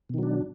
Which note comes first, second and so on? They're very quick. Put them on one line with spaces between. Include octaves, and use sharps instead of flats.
B2 D#3 F#3 D4